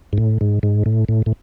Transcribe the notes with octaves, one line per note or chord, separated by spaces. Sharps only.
G#2
A2
G#2
G#2
A2
A2
A2